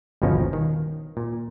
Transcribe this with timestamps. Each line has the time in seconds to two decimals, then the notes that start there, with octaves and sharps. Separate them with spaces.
0.22 G1 D#2 B2 F3 C#4 D#4
0.53 D#3
1.17 A#2